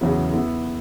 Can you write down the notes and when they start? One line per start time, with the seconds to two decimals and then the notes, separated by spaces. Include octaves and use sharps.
0.01 E2 C#3 F#3 B3 E4
0.33 B3 E4